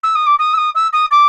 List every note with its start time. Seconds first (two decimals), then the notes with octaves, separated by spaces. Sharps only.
0.03 E6
0.15 D#6
0.26 D6
0.39 D#6
0.53 E6
0.57 D#6
0.75 E6
0.93 D#6
1.11 D6